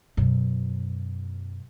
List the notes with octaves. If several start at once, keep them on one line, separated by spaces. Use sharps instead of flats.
F#2 B2